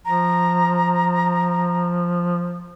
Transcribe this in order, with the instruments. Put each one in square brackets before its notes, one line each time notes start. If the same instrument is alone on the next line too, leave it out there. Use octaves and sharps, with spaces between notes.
[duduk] F3 [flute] A#5